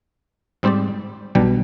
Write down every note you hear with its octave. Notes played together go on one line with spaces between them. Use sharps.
G#2 G3 C4 G4 D5
B1 B2 G3 D4 G4